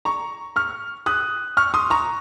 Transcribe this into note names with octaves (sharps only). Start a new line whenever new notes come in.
A#5 C#6
C#6 F6
D#6 F#6
C#6 F6
C6 D#6
A#5 C#6